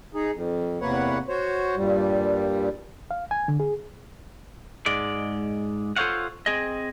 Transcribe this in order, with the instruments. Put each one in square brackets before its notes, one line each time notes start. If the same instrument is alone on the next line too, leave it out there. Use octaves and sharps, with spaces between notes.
[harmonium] D#4 G#4
F2
E2 C3 A#3 B4 C#5 F#5
F#4 C5 C#5
G2 A#2 G3
[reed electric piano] F5
G#5
D3
G#4
[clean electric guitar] G#2 G#3 D5
F4 A4 C5 C#5 F5 F#5
C4 G#4 D#5